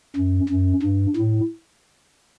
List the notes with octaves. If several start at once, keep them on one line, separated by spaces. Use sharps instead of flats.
F#2
F#2
G2
A2